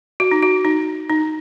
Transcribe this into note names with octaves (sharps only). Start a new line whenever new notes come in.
F#4
D#4
F#4
D#4
D#4